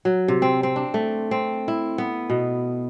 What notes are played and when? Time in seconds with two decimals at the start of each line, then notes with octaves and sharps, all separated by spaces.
0.05 F#3
0.28 C3
0.42 C4
0.63 C4
0.76 D4
0.94 A3
1.31 C4
1.68 E4
1.98 B3
2.30 B2